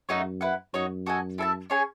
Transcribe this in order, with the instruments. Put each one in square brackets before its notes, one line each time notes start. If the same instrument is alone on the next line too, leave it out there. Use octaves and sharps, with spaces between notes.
[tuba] F#2 [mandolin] A3 D#4 F#4 C#5
[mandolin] E4 B4 F#5
[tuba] F#2 [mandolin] D#4 F#4 C#5
[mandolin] F#4 A4 D#5 G#5
E4 A4 E5 A5
C#4 G#4 C#5 G#5